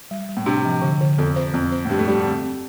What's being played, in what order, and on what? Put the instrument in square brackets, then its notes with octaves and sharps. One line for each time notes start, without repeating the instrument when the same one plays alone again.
[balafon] G3
G3
[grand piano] A2
[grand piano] C3 [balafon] D4
[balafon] F3
D3
D3
[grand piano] F2 [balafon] A4
[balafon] C5
[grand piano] F2 [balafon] C4
[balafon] C5
[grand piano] A2
[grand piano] G2 [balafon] G4
[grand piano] A3
[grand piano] G3 [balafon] G4
[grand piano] D3
[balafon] C4
C4